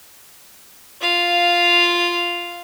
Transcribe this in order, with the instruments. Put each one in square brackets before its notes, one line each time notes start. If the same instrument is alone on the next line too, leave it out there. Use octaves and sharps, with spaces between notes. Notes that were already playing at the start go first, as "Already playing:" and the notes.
[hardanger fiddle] F4 F5